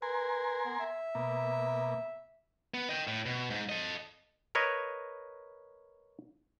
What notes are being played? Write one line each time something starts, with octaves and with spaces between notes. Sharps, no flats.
A#4 B4 G#5 C6
B3
E5
B2 A#3
B3
D#5 G5
A2
B2
G#2
A4 D#5
A#4 B4 C#5 D#5